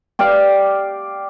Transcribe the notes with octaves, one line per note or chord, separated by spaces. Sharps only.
G4 D5 F5